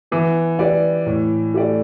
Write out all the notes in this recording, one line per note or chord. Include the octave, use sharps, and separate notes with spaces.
E3 B3
G4 B4 D5
A2
A3 G4 D5